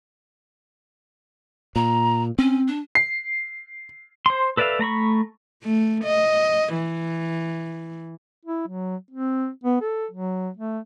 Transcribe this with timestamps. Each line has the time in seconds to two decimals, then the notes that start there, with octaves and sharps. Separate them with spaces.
1.76 A#2 A#5
2.39 C4 C#4
2.68 D4
2.95 C7
4.26 C5 C6
4.57 A4 B4 D5 E5 F5
4.79 A3 A#5 B5 C#6
5.63 A3
6.04 D#5
6.74 E3
8.45 E4
8.68 F#3
9.11 C4
9.64 B3
9.82 A4
10.11 F#3
10.57 A3